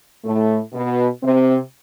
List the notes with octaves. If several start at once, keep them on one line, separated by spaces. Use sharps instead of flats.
A2 A3
B2 B3
C3 C4